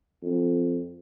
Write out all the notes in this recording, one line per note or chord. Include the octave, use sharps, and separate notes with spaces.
F2